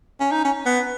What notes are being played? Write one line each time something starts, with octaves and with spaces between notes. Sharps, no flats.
C#4
D#4
C#4
B3